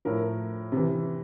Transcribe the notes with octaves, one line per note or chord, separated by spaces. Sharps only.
A2 F3 A#4
C3 E3